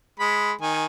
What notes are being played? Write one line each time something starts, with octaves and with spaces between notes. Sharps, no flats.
G#3 B5
D#3 D#4 G#5